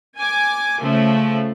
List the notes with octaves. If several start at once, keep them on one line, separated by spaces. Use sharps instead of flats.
G#5 D6
C#3 F3 A3